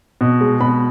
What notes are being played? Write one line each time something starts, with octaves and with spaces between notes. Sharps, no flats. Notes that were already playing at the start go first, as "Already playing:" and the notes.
B2
G#3
B2 B5